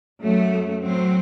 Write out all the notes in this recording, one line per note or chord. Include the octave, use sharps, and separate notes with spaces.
F#2 F#3 A3
A2 F#3 C4